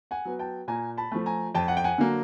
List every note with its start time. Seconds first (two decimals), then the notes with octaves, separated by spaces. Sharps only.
0.11 F#5 G#5
0.25 F#3 B3
0.39 G5 A5
0.68 A#2 G#5 A#5
0.97 A5 B5
1.12 F3 A3
1.26 G#5 A#5
1.55 F2 G5 A5
1.68 F#5
1.77 G5
1.84 F#5 G#5
1.98 D3 F#3 A#3